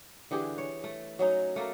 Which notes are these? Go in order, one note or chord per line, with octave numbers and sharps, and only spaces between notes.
D3 E3 G4 G#4
C#5
A3
F#3 C#4 D#4
A3 A#3 A4 A#4